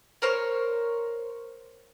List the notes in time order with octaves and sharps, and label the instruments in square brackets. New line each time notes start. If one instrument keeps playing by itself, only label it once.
[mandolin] A#4 C5 C#5